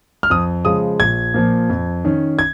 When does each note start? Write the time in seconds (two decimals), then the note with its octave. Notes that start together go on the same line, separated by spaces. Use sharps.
0.23 F6
0.30 F2 D#6
0.65 C#3 F3 G#3 D#6
1.00 A#1 G#6
1.34 A#2 F3 A#3
1.70 F2
2.05 D#3 C#4
2.39 G#6